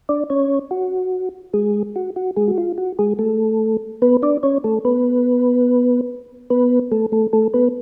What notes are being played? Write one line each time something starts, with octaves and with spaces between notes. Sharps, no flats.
D4 D5
C#4 C#5
F#4
G#3 G#4
F#4
F#4
G#3 G#4
F#4
F4
F#4
G#3 G#4
A3 A4
B3 B4
D4 D5
C#4 C#5
A3 A4
B3 B4
B3 B4
A3 A4
A3 A4
A3 A4
B3 B4